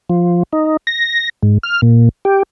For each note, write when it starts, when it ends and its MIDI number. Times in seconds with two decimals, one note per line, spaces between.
0.10 0.43 53
0.53 0.77 63
0.87 1.29 94
1.43 1.58 44
1.63 1.81 89
1.82 2.09 46
2.25 2.43 67